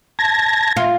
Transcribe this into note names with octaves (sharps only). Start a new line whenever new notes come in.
A5 G#6 A#6
F4